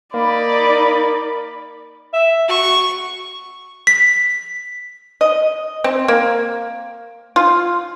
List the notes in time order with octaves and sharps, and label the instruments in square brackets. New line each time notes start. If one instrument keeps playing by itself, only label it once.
[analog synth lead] A#3 [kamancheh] D#4 D5 [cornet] B5
[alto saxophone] E5
[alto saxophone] F#4 [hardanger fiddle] C#6
[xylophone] B6
[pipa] D#5
C4
A#3
F4